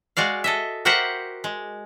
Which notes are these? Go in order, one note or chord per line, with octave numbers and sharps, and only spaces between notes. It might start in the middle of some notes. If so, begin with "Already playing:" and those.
G#3 F#4 D5 F5
A4 D#5 E5
F#4 G4 A#4 C5 E5 F#5
G#3